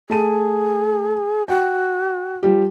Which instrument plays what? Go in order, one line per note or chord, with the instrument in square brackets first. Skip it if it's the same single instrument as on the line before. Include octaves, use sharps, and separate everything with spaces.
[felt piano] A3 A5 D#7 [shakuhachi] G#4
[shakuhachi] F#4 [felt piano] G5
[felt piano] F3 G3 G4